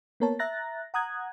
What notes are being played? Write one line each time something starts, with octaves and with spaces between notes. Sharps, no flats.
A#3 B3 A#4 C#5 A5
E5 A#5 F#6 A6 A#6
F#5 A#5 D#6 F#6 G#6